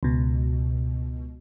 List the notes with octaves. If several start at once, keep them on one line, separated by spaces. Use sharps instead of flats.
C#2 B2